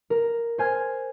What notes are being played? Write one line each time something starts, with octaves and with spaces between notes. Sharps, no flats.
A#4
C5 G#5 F6 G#6